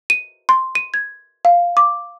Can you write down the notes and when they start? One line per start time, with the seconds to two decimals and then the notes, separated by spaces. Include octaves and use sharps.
0.10 D#7
0.49 C6
0.75 D#7
0.94 G#6
1.45 F5
1.77 D6